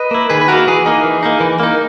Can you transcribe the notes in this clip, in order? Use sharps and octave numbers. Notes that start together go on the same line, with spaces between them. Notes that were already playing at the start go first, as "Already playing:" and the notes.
Already playing: B4 D#5
A#3 E4
D#3 G#4 B4
B4
A#3 E4 F#4 A#4
E3 G#4
A#3 D#4
E3
A#3 D#4
E3
A#3 D#4